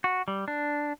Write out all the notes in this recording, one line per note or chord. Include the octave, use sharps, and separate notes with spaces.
F#4
G3
D4